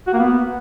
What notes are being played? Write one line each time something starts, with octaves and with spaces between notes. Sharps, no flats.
F#4
A#3
B3